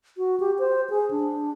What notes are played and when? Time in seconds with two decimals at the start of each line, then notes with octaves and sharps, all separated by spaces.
0.17 F#4
0.40 G4
0.59 C5
0.90 G#4
1.11 D4